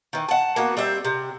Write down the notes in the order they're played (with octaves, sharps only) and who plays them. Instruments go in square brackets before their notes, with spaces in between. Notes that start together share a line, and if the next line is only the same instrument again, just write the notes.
[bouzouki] D#3 E3
F#5 A5
A#3 B3 F#4
G3 C4 E5
C3